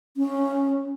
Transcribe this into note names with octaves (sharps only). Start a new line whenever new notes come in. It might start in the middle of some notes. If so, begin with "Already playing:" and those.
C#4